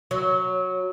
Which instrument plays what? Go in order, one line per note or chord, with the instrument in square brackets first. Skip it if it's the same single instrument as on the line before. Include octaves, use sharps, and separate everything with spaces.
[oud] F#3